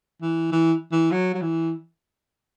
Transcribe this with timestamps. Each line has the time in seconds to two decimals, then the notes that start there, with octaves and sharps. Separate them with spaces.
0.22 E3
0.52 E3
0.92 E3
1.12 F#3
1.34 F#3
1.42 E3